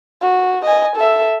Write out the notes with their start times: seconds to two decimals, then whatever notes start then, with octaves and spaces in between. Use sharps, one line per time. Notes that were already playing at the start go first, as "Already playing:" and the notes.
0.22 F#4
0.65 D#5 G#5
0.96 A4 E5